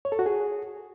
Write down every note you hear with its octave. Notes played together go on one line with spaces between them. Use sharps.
C#5
A4
F#4
G#4